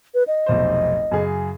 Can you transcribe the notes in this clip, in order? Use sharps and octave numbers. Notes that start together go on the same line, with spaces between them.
B4
D#5
F1 B1 C5
F#2 C#3 G#4